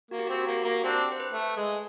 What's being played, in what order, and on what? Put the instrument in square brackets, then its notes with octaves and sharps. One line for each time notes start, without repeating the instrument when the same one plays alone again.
[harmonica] A#3 [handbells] F#4
[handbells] G4
[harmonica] C4 [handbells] F#4
[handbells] G4
F#4
[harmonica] A#3 [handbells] G4
[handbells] F#4
[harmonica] A#3
[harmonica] C4 D4 [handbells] G4
[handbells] C5
B4
[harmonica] A3
G#3